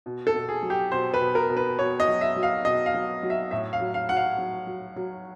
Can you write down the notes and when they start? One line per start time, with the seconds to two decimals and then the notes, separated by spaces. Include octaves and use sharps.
0.06 B2
0.27 A4
0.34 B2
0.49 G#4
0.63 F#3
0.70 G4
0.92 B2 C5
1.14 B4
1.20 B2
1.35 A#4
1.49 B2
1.57 B4
1.79 B2 C#5
2.00 D#5
2.07 F#3
2.21 E5
2.36 F#3
2.43 F5
2.65 B2 D#5
2.86 F5
2.94 F#3
3.23 F#3
3.30 E5
3.51 A2 E5
3.73 F5
3.80 F#3
3.94 F5
4.09 F#3 F#5
4.17 F5
4.38 F#3
4.67 F#3
4.96 F#3